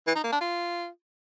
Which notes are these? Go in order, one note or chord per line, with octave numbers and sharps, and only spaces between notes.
E3
D#4
A#3
D4
F4